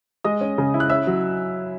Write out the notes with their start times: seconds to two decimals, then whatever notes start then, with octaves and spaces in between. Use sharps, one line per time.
0.24 G#3 D#5 D#6
0.41 C#4
0.58 C#3
0.74 E4
0.80 F#6
0.90 C#4 E5 E6
1.07 F#3